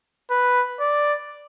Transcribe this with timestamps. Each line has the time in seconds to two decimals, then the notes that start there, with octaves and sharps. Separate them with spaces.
0.30 B4
0.80 D5